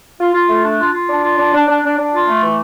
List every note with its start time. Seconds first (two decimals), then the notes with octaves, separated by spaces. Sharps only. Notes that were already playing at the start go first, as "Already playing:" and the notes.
0.21 F4
0.35 F4
0.49 A3
0.64 D4
0.79 F4
0.94 F4
1.09 D4
1.24 F4
1.38 D4
1.54 D4
1.68 D4
1.84 D4
1.99 D4
2.14 F4
2.28 A3
2.43 E3